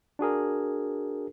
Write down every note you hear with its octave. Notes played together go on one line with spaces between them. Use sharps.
D4 F#4 G#4 A#4